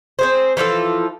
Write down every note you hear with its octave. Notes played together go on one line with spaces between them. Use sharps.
C4 G#4 C5
E3 F3 F4 A4